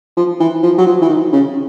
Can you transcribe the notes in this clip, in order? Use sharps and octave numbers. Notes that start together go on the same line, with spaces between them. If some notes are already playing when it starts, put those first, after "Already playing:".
F3
E3
F3
F#3
F3
E3
D#3
C#3